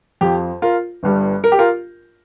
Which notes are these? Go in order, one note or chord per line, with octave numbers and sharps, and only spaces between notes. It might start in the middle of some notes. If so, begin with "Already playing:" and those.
F2 F3 G4
F4 A#4
G1 G2 G3
A#4
G4
F4 A#4